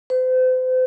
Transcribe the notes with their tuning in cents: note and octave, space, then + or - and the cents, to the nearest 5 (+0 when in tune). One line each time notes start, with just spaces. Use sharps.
C5 -35